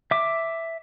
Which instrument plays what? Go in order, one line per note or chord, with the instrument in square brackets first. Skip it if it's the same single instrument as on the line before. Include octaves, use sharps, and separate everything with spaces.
[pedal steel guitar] E5 D6